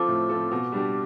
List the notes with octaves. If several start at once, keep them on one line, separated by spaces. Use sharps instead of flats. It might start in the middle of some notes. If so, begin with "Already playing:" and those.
Already playing: F3 C4 F4 A4 D6
A2
F3 C4 F4 A4
B2
G3 D4 G4